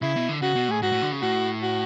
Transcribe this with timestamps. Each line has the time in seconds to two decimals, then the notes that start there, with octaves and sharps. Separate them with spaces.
0.02 C#3 E4
0.16 B2
0.29 D3
0.42 C#3 F#4
0.55 B2
0.68 A2 G#4
0.82 G#2 F#4
0.92 A2
1.02 D3
1.12 C#3
1.22 A2 F#4
1.63 F#4